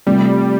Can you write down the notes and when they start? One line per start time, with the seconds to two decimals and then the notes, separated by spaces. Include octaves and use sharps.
0.07 C3 F3 G3 A3